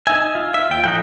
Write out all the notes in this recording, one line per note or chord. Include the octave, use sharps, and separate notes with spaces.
D#4 E5 G#5
F4
E5
D#2 G5
A2 F3 D#4 F#5 G5